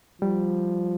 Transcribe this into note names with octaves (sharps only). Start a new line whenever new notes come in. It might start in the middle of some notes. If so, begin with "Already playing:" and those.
F3 G3